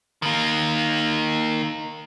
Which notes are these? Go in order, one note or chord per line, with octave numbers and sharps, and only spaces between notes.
D#3 A#3